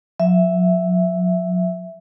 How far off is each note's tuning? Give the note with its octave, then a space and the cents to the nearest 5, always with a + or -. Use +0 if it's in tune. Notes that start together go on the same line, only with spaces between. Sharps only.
F#3 -40 E5 +0